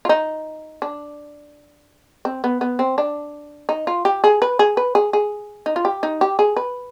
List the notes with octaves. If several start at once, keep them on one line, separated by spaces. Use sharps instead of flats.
F4
D#4
D4
C4
B3
B3
C4
D4
D#4
F4
G4
G#4
B4
G#4
B4
G#4
G#4
D#4
F4
G4
D#4
G4
G#4
B4